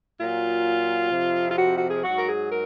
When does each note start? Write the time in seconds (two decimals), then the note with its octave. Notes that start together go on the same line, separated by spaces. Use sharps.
0.19 A#2 F#3 F4
1.12 F2 C3 F3
1.49 F4
1.57 F#4
1.76 F#4
1.89 G#4
2.04 G#2 F#3 F#4
2.16 A#4
2.27 G#4
2.50 A#4